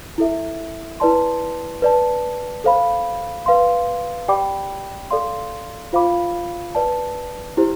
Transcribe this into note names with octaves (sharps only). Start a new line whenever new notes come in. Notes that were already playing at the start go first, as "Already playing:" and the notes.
E4 A4 E5
E4 B4 D5 A5 C6
B4 D5 A5
A4 C5 F5 B5
B4 F5 C6
G4 D5 G5 B5 D6
A4 D5 F5 C6
F4 C5 F5 B5 D6
B4 D5 A5
E4 G4 C5